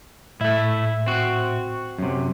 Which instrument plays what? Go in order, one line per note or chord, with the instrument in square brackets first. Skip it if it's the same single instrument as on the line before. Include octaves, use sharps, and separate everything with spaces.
[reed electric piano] A2 E5 [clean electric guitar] A3 E4
[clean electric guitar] C4 F#4
F#2 C3